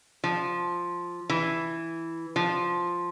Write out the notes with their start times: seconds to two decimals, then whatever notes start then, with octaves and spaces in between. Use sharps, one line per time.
0.24 F3
1.29 E3
2.36 F3